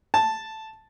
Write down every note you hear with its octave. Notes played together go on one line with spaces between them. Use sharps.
A5